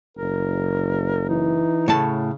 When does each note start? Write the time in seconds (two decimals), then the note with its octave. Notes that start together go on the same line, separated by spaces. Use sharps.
0.17 F#1 A#4
1.29 E3 D#4
1.88 A2 C#3 A3 A5